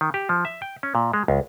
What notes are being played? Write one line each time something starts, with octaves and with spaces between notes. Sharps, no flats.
D#3
G4
F3
E5
G5
C#4
A#2
G#3
C#2